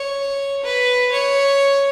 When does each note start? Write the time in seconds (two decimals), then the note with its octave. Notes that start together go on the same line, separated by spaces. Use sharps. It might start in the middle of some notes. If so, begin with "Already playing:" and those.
Already playing: C#5
0.64 B4
1.12 C#5